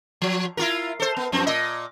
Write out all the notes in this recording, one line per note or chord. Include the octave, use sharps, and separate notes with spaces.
F3
E4 F4 A#4
A4 C5
B3
F#2 F3 C4
A#2 D#5